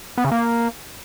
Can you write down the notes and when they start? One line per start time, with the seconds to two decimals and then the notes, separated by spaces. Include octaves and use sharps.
0.18 B3
0.25 C#3
0.32 A#3